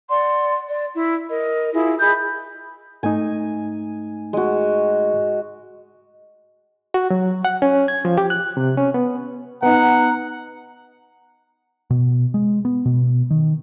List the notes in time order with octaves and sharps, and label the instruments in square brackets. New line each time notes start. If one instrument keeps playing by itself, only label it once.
[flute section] D5 F#5 C6
D5
E4
A#4 D#5
E4 F4 G#4
G#4 D#5 B5 G6
[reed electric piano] G#2 A3 D#4 [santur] G#5
[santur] G#3 F#4
[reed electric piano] F#4
F#3
F#5
C#4
G#6
F3
G4
F#6
C3
C#4
B3
[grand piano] B3 D#4 [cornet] F#5 [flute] A#5
[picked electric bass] B2
G#3
B3
B2
D#3